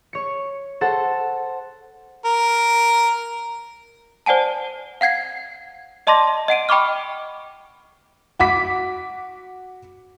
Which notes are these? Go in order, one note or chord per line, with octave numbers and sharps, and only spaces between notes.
C#5 C#7
A4 C5 F#5 A5
A#4
C5 D5 F#5 G#5 A5
F5 F#5 G#6 C7
D5 D#5 A5 C6 D6 A#6
D#5 F#5 D7 D#7
D#5 G5 B5 C#6 D6 F6
F#4 D6 B6